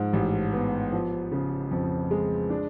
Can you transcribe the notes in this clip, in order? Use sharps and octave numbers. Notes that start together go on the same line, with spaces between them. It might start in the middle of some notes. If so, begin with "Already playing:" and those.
Already playing: G#2 F3
A1
B3
F3
C#3
F2
G#3
D4